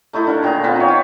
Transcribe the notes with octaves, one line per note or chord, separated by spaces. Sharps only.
A3 D#4 E4 A4
D3 A#4
A#2 D#3 G#4 A#5
B3 C4 F4 B4
D#4 C#5
F4